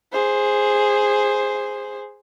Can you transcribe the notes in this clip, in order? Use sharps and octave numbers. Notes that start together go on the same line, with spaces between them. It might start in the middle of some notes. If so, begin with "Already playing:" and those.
G#4 C5